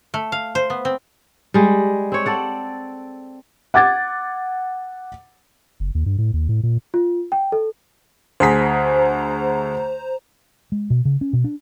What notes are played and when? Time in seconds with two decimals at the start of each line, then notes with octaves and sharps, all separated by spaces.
0.14 A3
0.32 F5
0.55 C5
0.70 B3
0.85 C4
1.54 G3 G#3
2.12 C4 C#5
2.26 A4 D5 F#5
3.74 F#5 D6 G#6 A6
5.80 F#1
5.95 D#2
6.06 G2
6.18 A2
6.34 D#2
6.49 A2
6.63 A#2
6.94 F4
7.32 G5
7.52 A4
8.40 D2 G#4 C5 A#5 B6
10.72 G#3
10.90 B2
11.05 C#3
11.21 C#4
11.33 B2
11.44 D4